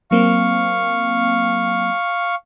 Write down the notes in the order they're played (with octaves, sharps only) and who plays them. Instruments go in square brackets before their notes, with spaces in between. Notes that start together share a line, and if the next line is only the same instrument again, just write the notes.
[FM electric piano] F#3 A#3 C4 [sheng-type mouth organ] F5 C#6